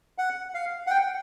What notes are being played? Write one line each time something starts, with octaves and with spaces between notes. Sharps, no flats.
F#5
F5
F#5
G5